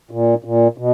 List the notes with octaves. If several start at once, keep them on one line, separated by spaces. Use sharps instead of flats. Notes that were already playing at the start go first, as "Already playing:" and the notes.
A#2
A#2
B2